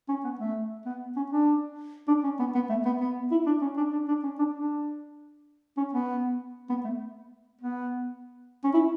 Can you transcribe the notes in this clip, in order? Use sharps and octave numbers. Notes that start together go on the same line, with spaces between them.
C#4
B3
A3
B3
C#4
D4
D4
C#4
B3
B3
A3
B3
B3
E4
D4
C#4
D4
D4
D4
C#4
D4
D4
C#4
B3
B3
A3
B3
C#4
E4